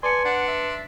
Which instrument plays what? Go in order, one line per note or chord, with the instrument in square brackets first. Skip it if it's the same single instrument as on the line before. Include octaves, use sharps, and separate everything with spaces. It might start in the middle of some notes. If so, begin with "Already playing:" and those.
[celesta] B4 A5 C#7 [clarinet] D5 [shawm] G#5 [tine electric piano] C6
[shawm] D4 [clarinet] F#5
[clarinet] E5